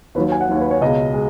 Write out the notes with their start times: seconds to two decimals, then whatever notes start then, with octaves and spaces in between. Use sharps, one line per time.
0.15 D#2 D#3 F#3 B4
0.32 G#5
0.41 F#5
0.49 D#2 D#3 F#3
0.60 B4
0.71 C#5
0.81 C#2 B2 G#3 D#5
1.14 G#3